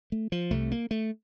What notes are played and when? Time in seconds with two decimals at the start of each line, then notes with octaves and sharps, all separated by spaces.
0.12 A3
0.32 F3
0.51 C2 C3 A3
0.72 A#3
0.91 A3